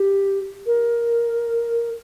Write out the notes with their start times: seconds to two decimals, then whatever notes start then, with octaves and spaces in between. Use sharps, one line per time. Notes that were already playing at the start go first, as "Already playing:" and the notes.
Already playing: G4
0.66 A#4